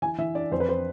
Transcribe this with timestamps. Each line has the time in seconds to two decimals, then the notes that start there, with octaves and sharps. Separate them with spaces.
0.02 E3 G#5
0.18 E3 E5
0.35 D4 D5
0.52 F2 C5
0.60 B4
0.69 C5